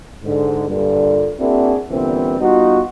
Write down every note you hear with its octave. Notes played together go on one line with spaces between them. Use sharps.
G#2 D3
G2 A#2 D3
A#3 C4 D4 E4 F#4 G#4
A#2 D3 E3 G3 B3 C4
G3 B3 D#4 F4 F#4